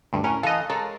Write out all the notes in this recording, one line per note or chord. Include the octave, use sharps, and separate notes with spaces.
D2 G2
A2 C#4 A#4
E3 A4 D#5 F5
G#3 A4 A#4 C#5